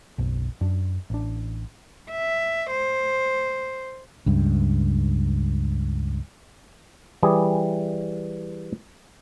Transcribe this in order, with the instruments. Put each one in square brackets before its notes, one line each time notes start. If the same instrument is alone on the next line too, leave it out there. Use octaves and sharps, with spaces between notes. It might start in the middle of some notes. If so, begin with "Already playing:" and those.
[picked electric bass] F#1 B1
F#2 D4
A1 D4
[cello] E5
C5
[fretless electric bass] C#2 G2
[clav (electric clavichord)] E3 G3 G#4